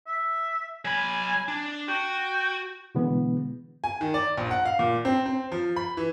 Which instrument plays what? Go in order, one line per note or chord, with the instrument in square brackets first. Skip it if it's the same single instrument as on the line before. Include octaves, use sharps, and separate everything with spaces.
[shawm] E5
[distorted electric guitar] F#3 B5 [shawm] G#5
[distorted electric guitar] D4
[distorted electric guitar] F#4 [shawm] G5
[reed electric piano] B2 D3 E3 G#3 B3
[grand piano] G#5
D#3
D5
A#1
F#5
F5
A#2
C4
C4
F3
B5
E3